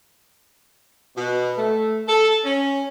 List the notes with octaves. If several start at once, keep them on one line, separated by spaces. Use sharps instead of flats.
B2
A3
A4
C#4